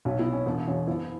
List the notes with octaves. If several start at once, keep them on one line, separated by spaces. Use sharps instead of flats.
B1 C#4 F#4
B3 E4
B2
C#4
E1 B3
E2 B2 C#4
F#1 B3 E4